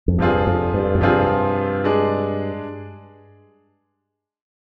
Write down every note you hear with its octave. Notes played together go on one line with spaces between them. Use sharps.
F2
G2 C3 F3 C4 F4 G#4
F2
G2
F2
G2 C3 F3 C4 F4 G#4
G#3 D4 G#4